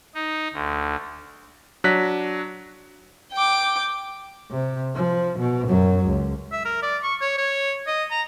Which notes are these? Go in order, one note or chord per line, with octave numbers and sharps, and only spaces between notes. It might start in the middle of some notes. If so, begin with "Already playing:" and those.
D#4
D2
F#3 D4 F#6 A#6 B6
G5 D6
C3
F3
B2
F#2 F#3
C#2
E5
A#4
D5
C#6
C#5
C#5
D#5
A#5